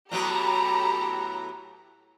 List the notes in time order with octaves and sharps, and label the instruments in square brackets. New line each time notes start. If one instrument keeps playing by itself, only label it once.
[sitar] A2 F#3 B3 [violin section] G4 A4 A#5